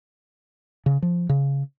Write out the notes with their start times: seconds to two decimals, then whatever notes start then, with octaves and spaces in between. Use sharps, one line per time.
0.86 C#3
1.02 F3
1.29 C#3